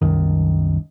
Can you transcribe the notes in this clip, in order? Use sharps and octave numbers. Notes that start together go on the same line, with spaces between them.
C2 F#2 D#3